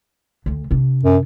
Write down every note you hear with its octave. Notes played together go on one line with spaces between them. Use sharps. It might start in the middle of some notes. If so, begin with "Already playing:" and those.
D2 D3
C3 D4
F#2